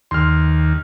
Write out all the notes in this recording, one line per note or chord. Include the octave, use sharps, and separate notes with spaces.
D#2 C6 F6